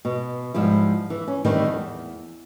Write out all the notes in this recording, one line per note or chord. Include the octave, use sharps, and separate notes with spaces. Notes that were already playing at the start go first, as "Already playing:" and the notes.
B2
G#2 F3 G3 E4
E3
C#4
A2 D#3 E3 G3 C4
E2